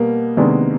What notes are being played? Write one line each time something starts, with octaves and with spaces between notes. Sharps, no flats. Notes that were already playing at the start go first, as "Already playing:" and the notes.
Already playing: B2 G3 A#3 B3
C3 D#3 G#3 B3 D4